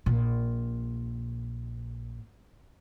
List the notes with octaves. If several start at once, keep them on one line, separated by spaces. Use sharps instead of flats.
A#1 A#2